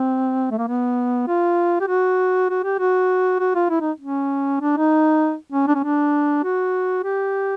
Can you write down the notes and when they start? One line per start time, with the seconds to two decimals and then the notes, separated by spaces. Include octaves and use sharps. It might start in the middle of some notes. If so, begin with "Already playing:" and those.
Already playing: C4
0.51 A3
0.58 A#3
0.67 B3
1.28 F4
1.80 G4
1.88 F#4
2.49 F#4
2.63 G4
2.79 F#4
3.40 F#4
3.55 F4
3.70 E4
3.81 D#4
4.00 C#4
4.61 D4
4.77 D#4
5.52 C#4
5.68 D4
5.74 C#4
5.83 D4
6.44 F#4
7.03 G4